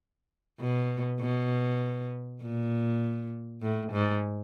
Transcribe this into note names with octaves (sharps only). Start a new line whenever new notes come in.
B2
B2
A#2
A2
G#2